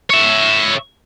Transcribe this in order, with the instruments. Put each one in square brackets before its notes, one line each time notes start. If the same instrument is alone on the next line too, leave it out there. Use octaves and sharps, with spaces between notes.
[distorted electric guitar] C#5 E5